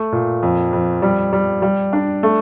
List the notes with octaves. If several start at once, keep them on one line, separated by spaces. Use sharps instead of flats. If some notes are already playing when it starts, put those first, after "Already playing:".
Already playing: A3
A#2
F2
F2
G3
G3
G3
D4
A3